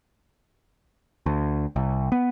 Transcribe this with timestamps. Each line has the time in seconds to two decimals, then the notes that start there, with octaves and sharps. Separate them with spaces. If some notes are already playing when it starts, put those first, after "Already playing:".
1.26 D2
1.76 C2
2.12 B3